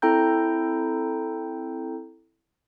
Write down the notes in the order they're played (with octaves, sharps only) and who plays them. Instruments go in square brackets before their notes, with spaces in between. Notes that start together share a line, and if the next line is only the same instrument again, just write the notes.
[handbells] C4 E4 A4 G5 A#5 G6